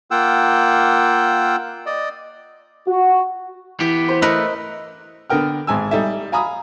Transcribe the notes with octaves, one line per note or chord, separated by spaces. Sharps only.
A#3 F4 F#5 G5 E6
D5 D#5
F#4
E3 B3 G4
C5
A3 A#4 B4 D#5
D3 B3 A#4 G5 F6
G#1 G#2 G#5 E6
G3 D#4 A4 E5
F5 G#5 A#5 B5 D#6